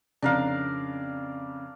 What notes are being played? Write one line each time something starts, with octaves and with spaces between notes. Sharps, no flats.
F2 C#3 D4 A#4 F5